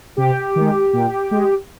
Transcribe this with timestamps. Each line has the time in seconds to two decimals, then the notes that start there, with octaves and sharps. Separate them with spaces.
0.17 C3 G4
0.56 D#3 G#3
0.93 A#2
1.31 G#3